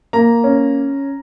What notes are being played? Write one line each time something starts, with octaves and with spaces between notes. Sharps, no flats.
A#3 A#5
C#4